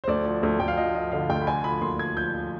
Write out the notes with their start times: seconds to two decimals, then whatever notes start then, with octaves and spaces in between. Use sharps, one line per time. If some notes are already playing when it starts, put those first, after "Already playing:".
0.04 C5
0.08 D2 D5
0.26 F3
0.43 D2
0.60 D2 G5
0.68 F5
0.77 F3 D#5
0.94 F3 D#5
1.12 D3 F5
1.29 D2 G5
1.42 B5
1.47 D3 G#5
1.64 F3 B5
1.81 D#2 C6
1.98 F3 G#6
2.16 F3 G6
2.33 F3